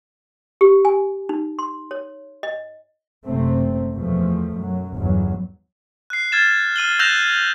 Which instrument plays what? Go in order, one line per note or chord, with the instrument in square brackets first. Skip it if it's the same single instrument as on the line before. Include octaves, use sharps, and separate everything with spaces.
[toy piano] G4
G#5
D#4
C6
C#5
D#5
[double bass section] F#1 C3 A3 C4
E2 B2 F3 A3
F#2 F#3
G1 E2 F#3
[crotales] F#6 C7
F6 G#6 A6 E7
F6 D#7 F#7 G7
E6 F#6 G6 A#6 E7 F7